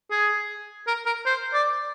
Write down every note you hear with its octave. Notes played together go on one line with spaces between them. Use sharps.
G#4
A#4
A#4
C5
D5